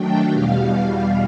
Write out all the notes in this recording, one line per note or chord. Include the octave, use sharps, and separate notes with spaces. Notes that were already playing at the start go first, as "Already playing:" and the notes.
Already playing: D#3 F#3 A3 D4 G5
E2 B2 G3 F5